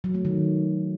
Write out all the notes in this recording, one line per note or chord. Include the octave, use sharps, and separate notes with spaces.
F#3
A3
D#3